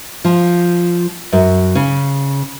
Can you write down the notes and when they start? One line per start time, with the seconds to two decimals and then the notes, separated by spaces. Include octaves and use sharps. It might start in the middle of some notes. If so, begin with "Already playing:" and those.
0.25 F3
1.33 F#2
1.75 C#3